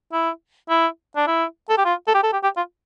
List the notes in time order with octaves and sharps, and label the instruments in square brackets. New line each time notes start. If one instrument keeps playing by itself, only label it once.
[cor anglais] E4
E4
D4
E4
A4
G4
F4
A4
G4
A4
G4
G4
F4